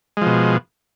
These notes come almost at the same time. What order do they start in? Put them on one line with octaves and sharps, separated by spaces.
G#3 F3 B2